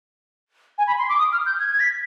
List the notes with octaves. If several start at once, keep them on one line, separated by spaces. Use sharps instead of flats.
G#5
B5
C6
D6
D#6
F6
G6
G#6
G#6
B6